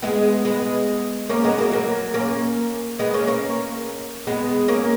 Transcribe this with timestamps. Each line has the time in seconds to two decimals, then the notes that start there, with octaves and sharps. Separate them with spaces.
0.02 G#3 B3
0.45 G#3 B3
1.29 A#3 C#4
1.44 G#3 B3
1.58 F#3 A#3
1.72 F#3 A#3
2.14 A#3 C#4
2.99 G#3 B3
3.14 A#3 C#4
3.27 A#3 C#4
4.27 G#3 B3
4.68 A#3 C#4